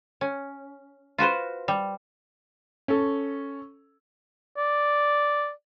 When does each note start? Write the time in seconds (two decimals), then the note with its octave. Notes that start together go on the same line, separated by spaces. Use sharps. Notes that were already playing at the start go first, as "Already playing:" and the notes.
0.21 C#4
1.18 F4 F#4 B4 C5
1.68 G3
2.88 C#4 A4
4.58 D5